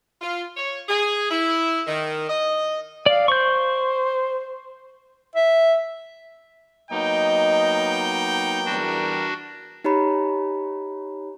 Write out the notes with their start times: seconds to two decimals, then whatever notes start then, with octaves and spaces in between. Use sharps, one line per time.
0.21 F4
0.57 C#5
0.89 G#4
1.31 E4
1.87 D#3
2.29 D#5
3.06 D5 F5
3.28 C5 C#6 G6
5.35 E5
6.91 F#3 A#3 B3 D#4 D#5 G5
8.66 E2 G3 D4 F#4 A#4
9.84 D#4 G4 C#5 A#5 B5